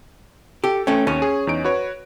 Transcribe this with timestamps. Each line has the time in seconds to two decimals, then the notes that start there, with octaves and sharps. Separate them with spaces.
0.64 G4 A4
0.87 A3 C#4 G5
1.07 D#2 C#4
1.22 G#4
1.47 E2 D#4 D7
1.64 F#4 B4 C#5